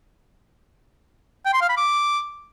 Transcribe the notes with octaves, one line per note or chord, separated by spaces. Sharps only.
G5
C6
F5
B5
D6